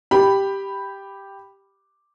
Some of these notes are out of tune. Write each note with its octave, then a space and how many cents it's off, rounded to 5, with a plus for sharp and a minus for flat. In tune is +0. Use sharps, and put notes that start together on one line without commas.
G4 +0 B5 +0